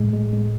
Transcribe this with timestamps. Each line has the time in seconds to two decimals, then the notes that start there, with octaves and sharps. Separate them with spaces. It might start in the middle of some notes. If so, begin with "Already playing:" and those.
Already playing: A2 G#3
0.13 G#3
0.33 G#3